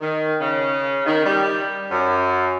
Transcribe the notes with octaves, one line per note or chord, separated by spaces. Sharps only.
D#3
C#3
D#3
G3
F#2